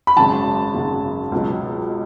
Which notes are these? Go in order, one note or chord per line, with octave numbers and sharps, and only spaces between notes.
B5
G#1 F#2 C#3 F#3 A5
G#1 F#2 C#3 F#3
C#2 B2 F#3